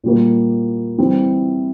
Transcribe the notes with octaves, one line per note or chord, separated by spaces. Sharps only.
A#2 G3 A#3
E3 G3 C4 E4